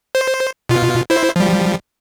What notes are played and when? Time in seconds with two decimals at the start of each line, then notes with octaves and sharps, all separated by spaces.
0.15 C5
0.69 B2 F4
1.10 E4 C5
1.36 F3 G3